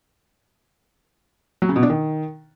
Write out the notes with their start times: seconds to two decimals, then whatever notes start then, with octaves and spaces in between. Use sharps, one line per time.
1.62 F#3
1.69 C#3
1.76 B2
1.83 D4
1.90 D#3